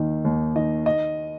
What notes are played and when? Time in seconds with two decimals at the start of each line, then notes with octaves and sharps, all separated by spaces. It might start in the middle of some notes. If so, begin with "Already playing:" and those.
Already playing: D#2 D#3
0.25 D#2
0.55 D#3 D#5
0.86 D#5